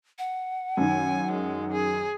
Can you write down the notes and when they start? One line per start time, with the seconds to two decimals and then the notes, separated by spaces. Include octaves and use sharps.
0.18 F#5
0.77 F#2 D#3 G#5
1.31 G#3
1.72 G#4